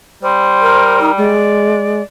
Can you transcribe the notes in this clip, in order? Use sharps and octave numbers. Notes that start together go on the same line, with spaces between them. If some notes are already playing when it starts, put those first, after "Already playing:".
G3 C5
A#4
D#4
G#3 D5